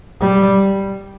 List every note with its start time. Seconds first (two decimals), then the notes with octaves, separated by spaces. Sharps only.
0.21 G3